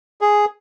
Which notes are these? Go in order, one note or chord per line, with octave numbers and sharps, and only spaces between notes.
G#4